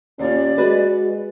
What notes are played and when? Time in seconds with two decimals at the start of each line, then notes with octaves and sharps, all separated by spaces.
0.19 D#2 C#4 F4 D5
0.58 G#3 F#4 B4
0.94 G#3